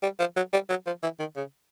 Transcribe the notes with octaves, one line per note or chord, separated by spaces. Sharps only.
G3
F3
F#3
G3
F#3
F3
E3
D#3
C#3